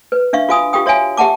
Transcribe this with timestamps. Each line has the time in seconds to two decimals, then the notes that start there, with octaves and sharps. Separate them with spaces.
0.12 B4
0.33 D4 E5 F5 C#6
0.49 F4 F#4 F5 G#5 D#6
0.73 F4 G4 F5 G5 D#6
0.86 F#4 C#5 E5 F5 G#5
1.17 G4 E5 F#5 A5 D6